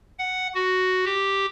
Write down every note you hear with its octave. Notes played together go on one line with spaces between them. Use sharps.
F#5
F#4
G4